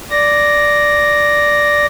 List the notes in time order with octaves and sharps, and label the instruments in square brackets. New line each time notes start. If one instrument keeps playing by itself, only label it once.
[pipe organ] D5 A#6